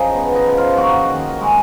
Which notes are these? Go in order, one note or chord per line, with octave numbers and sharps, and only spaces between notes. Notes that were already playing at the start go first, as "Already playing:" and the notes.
Already playing: C#3 F3 D#4 D#5
B3
D#4 D#5
F3
F4 F5
A#3 F#4 F#5
D#3
G#3